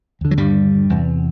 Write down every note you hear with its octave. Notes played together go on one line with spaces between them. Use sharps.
D#2 D3
F#3
G2 G3
E2 C3